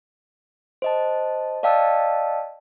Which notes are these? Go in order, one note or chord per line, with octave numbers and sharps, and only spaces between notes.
C5 D#5 A5
D5 D#5 F5 G5 A5 E6